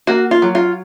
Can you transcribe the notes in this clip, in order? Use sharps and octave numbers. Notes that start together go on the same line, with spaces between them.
A#3 F#4
F4
F#3
F4